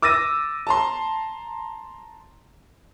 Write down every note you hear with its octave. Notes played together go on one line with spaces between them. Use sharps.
D6 E6 A6 A#6 D#7
A5 A#5 C6